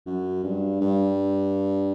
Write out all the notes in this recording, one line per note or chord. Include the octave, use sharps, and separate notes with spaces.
F#2
G2
G2